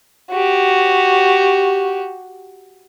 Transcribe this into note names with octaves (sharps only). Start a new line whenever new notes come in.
F#4 G4